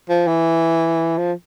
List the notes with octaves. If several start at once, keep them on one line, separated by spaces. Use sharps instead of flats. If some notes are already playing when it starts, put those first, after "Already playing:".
F3
E3
F3